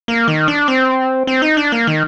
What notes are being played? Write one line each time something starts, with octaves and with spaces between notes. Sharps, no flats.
A#3
D#3
D4
C4
C4
D#4
D4
A#3
D#3